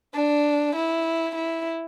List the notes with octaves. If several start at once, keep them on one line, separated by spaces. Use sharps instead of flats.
D4
E4
E4